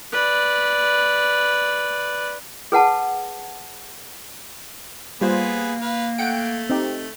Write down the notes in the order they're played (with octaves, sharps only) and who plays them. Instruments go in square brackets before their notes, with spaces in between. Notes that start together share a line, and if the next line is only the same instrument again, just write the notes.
[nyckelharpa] B4 D5
[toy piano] G#4 B4 F#5 A5
[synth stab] G3 F4 C5 [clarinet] A#3 [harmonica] B3 G#4 B4
[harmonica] B4 F5
[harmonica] A3 [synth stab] F#5 G5 D7
[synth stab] C4 D#4 G4